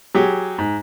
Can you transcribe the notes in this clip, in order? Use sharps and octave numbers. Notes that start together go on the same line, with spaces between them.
F#3 G4 G#4
G#2